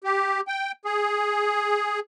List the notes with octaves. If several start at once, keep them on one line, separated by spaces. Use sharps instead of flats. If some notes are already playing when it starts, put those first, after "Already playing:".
G4
G5
G#4